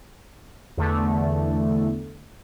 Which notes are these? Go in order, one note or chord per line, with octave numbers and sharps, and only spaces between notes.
E2 D3 A3